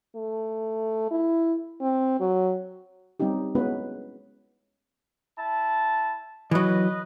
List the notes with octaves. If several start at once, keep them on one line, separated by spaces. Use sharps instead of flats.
A3
E4
C4
F#3
G3 C4 C#4 D#4 G4
G#3 B3 C#4 E4 F#4 B4
E4 A5
E3 F#3 B4 D#5